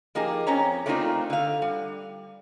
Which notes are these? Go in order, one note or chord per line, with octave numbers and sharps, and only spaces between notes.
F3 A#3 D#4 G4 G#4
F2 C4 C#4 A#5
A3 A#3 C4 D4 D#4 F4
D3 F5
G3